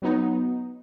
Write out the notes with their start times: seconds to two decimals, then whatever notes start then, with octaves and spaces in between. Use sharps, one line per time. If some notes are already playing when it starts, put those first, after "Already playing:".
0.02 F#3 B3 D#4